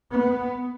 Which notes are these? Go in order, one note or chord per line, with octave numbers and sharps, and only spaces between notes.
B3